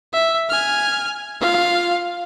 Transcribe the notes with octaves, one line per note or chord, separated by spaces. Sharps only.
E5
G#5 F6
F4 F5